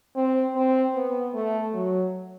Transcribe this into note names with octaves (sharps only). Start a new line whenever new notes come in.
C4
C4
B3
A3
F#3